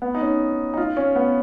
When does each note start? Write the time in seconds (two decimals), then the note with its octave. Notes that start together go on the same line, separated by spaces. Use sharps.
0.02 B3
0.15 D#4
0.21 C#4
0.74 D#4
0.77 F4
0.97 C#4
1.16 B3